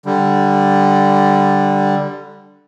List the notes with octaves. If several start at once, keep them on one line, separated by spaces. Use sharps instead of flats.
D3 G3